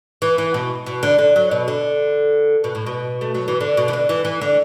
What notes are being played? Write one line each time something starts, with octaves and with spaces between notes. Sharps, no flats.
E3
E3
B2
B2
D3
D3
F#3
B2
D3
B2
A2
B2
A3
F#3
E3
D3
B2
E3
D3
E3
E3
D3